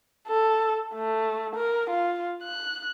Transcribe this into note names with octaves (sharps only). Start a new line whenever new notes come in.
A4
A3
A#4
F4
F#6